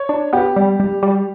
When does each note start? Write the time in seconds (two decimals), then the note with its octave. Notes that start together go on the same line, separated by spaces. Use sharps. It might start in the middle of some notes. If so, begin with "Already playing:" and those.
Already playing: C#5
0.09 D4
0.33 B3 G4
0.56 G3
0.80 G3
1.03 G3